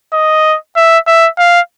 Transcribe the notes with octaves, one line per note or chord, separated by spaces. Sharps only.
D#5
E5
E5
F5